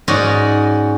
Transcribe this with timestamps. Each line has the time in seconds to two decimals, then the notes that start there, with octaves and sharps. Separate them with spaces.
0.08 G#2 C#4 F#4 D5 D#5